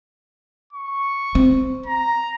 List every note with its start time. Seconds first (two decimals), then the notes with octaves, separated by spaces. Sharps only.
0.73 C#6
1.35 C4
1.86 A#5